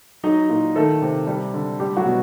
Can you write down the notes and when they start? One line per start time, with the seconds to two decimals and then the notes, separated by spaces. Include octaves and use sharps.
0.24 F#3 D#4 D#5
0.49 A#2
0.76 D#3 A3 A4
1.02 C3
1.27 G3
1.54 D3
1.80 G3 G4
1.97 F#3 F#4
2.05 B2